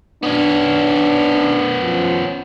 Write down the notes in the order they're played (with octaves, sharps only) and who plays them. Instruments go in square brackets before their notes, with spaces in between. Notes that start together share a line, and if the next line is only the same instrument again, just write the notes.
[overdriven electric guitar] B3 C#4 [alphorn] D4
[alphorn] F3